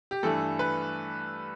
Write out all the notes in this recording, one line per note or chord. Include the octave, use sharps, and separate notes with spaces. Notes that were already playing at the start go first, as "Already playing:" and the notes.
G4
G2 E3 A3 A4
B4